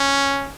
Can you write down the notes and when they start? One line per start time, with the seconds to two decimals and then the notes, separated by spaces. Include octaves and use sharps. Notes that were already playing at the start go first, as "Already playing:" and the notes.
Already playing: C#4